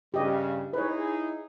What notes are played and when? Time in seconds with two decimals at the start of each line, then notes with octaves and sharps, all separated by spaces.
0.14 G2 C#3 G4 D#5
0.73 D#4 E4 G#4 B4 C#5